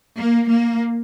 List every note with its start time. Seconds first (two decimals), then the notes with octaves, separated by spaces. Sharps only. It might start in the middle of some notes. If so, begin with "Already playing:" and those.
0.18 A#3
0.50 A#3